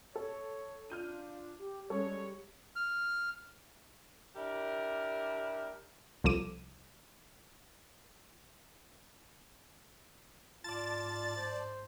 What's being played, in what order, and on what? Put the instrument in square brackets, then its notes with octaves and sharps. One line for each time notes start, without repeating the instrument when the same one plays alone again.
[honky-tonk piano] A4 [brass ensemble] C#5
[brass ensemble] D4 [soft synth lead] F4 [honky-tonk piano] F6 G6 D#7
[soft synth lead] G4
[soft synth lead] G3 [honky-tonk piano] G#3 C#4 A4 [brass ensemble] C#5
[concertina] F6
[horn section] D4 E4 G4 A#4
[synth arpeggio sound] C2 F3 A4 D6 D#7
[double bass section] G#2 [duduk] F4 [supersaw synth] D5 A5 [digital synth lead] A6
[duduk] C5